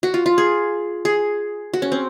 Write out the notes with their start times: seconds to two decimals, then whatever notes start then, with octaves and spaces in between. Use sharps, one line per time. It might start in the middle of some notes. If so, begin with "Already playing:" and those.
0.03 F#4
0.14 F4
0.26 F4
0.38 G#4
1.05 G#4
1.74 F#4
1.82 C#4
1.92 C4